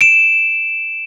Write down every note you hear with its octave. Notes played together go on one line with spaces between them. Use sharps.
D7 E7